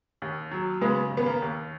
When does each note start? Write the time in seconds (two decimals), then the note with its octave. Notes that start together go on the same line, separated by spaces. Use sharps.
0.22 D#2
0.52 F#3
0.81 C#3 G#3 B3
1.11 D#2
1.17 B3
1.26 A#3
1.42 D#2